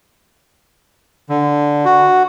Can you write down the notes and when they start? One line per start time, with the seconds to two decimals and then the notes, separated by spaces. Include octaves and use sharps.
1.29 D3
1.85 F#4